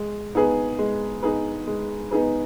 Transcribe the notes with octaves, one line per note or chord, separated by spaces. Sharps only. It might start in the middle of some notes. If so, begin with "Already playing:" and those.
Already playing: G#3
B3 D#4 G#4 B4
G#3
B3 D#4 G#4 B4
G#3
B3 D#4 G#4 B4